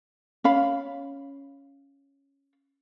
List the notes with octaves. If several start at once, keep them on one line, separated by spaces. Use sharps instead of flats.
C#4 F5 B5